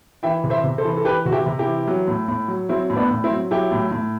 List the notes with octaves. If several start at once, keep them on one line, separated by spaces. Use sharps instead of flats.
E3 E5 G5
C3
C5 E5
C3
A4 C5
E3
A4
E3 G4 B4
C3 F#4
E4 G4
C3
E4 G4
E3
F#3
A2
A2
F#3
F#3 C4 E4
A2
B3 D4
A2
C4 E4
F#3
F#3 E4 G4
A2
A2